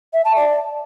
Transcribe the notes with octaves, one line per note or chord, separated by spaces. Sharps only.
E5
A5
D5